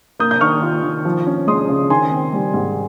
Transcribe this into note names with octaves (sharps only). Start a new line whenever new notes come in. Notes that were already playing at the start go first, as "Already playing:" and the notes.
A#3 D#6 G6
G6
D#3 C#6 F6
F4
D#3
F3
C#4
G#3 C6 D#6
C#3
D#3 G#5 C6
C4
G3
G#2